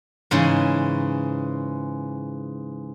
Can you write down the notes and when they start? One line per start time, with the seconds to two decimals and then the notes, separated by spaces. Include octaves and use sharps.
0.31 G#2 C#3 E3 G#3